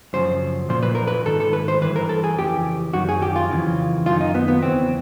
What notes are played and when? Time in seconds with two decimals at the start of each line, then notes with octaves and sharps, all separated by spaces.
0.13 F#2 C#3 F3 C5
0.69 A#2 F3 C5
0.83 B4
0.95 A#4
1.07 B4
1.25 G#2 D#3 A4
1.40 A4
1.53 B4
1.68 C5
1.81 G2 E3 B4
1.96 A#4
2.09 A4
2.24 G#4
2.38 F2 C#3 E3 G4
2.93 F#2 D#3 F#4
3.09 G#4
3.22 G4
3.36 F4
3.50 F2 C#3 E3
4.06 F#2 D#3 F4
4.21 D#4
4.35 B3
4.48 B3
4.62 E2 C#3 E3 C4